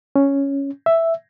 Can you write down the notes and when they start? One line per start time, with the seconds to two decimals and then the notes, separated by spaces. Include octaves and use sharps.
0.16 C#4
0.86 E5